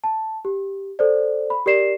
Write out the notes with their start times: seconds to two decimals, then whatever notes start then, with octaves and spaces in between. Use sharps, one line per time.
0.04 A5
0.45 G4
0.99 A4 C5 D5
1.50 B5
1.66 G4 A#4 D5 C7 E7